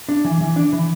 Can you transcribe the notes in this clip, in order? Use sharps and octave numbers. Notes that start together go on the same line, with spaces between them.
D4
E3
E3
D4
E3